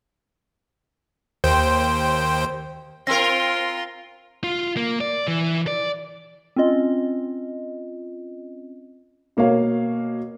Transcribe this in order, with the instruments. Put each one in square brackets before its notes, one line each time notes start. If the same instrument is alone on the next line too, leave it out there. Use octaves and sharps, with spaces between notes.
[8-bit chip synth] D#2 C5 G5
[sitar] C4 A#4 [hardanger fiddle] F4 C6 [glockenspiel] A#6
[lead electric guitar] F4
A#3
D5
E3
D5
[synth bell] C4 C#4 F4 D#5
[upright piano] B2 A#3 C#5 F5